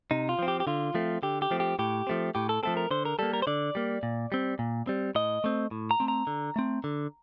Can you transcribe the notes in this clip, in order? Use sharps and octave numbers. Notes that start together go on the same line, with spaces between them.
C3 D#4
F4
F3 C4
G4
G4
D3 F4
F3 A3 C4
D3 G4
G4
F3 A3 C4
G4
A2 G4
F3 A3 C4
A2 G4
A4
F3 A3 C4 A4
A#4
D3 C5
A#4
G3 A#3 A4
A#4
C5
D3 D5
G3 A#3
A#2
G3 C4
A#2
G3 C4
A2 D#5
A3 C4
A2
A#5
A3 C4
A#5
D3
A3 C4
D3